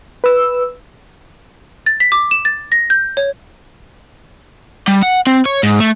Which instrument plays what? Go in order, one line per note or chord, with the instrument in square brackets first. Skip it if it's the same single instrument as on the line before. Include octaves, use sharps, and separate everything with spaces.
[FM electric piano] B4 E6
[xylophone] A6
B6
D6
E7
A6
A#6
G6
C#5
[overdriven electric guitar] G3
F#5
C4
C#5
G#2
A3